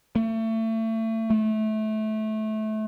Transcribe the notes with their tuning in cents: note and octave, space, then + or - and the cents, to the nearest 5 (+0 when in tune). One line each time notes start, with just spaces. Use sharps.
A3 +30
A3 -20